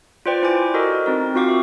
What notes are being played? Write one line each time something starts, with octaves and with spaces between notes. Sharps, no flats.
F4 B4 C5 D5 G5
E4 C5 G#5 D6
F#4 A4 A#4 D#5
C4 D#4 A#4
C4 F4 F#4 F5 C#6 D6
E5